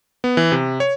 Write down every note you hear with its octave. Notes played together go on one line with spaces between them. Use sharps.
B3
E3
C3
C#5